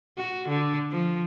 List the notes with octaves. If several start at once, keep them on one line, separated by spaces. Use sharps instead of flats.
F#4
D3
F3